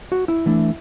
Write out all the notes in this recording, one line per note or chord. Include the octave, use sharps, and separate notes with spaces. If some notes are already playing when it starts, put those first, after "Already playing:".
F#4
E4
E3 A3 D4